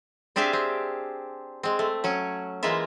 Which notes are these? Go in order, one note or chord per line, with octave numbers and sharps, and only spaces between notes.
C4 D4 G4 G#4 E5 F5
C4
G#3 C4
A3
F#3 C#4
E3 G#3 A#3 F4 E5